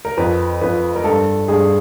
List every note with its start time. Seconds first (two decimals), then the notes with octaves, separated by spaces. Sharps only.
0.05 A#4
0.17 F2 B4
0.61 F2 B4
0.96 A#4
1.04 G2 A4
1.48 G2 G#4